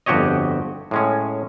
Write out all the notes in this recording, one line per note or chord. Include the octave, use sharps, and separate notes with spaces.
G1 F2 F#4 G4 C#5 D#5
A2 G#3 C#4